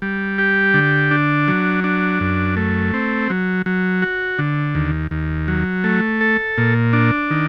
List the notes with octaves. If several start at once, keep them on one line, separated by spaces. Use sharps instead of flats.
G3
G4
D3
D4
F#3
D4
F#2
A3
C4
F#3
F#3
F#4
D3
D#2
D#2
F#3
A3
A4
A#2
D4
D#3